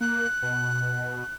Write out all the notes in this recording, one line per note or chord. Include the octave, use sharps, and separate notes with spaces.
A#3 F#6
B2